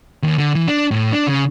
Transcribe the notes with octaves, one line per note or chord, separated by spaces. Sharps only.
D#2
D3
E3
D4
A2
D4
C#3